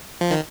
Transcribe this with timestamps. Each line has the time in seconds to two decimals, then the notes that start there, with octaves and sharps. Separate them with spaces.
0.21 F3
0.31 D#3